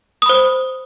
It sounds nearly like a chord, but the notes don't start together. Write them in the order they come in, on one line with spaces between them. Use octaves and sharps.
D#6 B5 C5